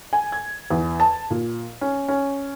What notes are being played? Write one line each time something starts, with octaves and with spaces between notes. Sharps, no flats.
G#5
G#6
E2
A5
A#2
C#4
C#4